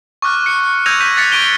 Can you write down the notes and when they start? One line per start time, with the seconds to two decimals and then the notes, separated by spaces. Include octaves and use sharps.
0.22 C#6 D6 F6 F#6
0.46 C#7
0.86 E6 G6 G#6 A#6 D#7 F7
1.00 G6 B6 D#7
1.16 F#6 A6 B6 C#7
1.32 C#6 F#6 D7 D#7 G7